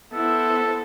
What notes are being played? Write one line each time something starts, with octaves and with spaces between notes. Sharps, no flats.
B3 E4 A4 C5 E6